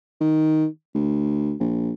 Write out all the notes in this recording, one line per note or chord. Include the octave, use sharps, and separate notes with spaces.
D#3
D2
A#1